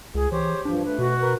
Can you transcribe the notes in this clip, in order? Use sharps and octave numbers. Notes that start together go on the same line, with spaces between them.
C#2 G#4
E3 G4 C5 C#5
G2 F3 D4
A3 B4
B2 F#4
A#4 B4